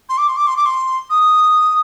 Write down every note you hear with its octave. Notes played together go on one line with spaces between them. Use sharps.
C6
D6
C6
D6
C6
D6
C6
D#6